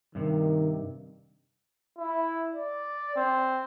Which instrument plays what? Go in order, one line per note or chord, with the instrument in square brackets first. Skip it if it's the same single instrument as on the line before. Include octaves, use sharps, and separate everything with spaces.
[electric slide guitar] G2 C3 [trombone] D#3
[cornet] E4
D5
C4